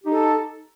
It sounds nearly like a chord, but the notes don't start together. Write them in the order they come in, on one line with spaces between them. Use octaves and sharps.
G4 D#4 A4